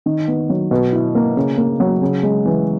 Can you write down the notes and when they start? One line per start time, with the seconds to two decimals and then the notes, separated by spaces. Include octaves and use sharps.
0.06 D#3
0.28 B3
0.49 F#3
0.71 B2
0.92 E4
1.15 A#3
1.36 C#3
1.58 A#3
1.80 F#3
2.01 C#3
2.23 G#3
2.45 E3